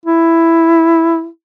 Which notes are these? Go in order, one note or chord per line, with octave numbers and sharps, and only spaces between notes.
E4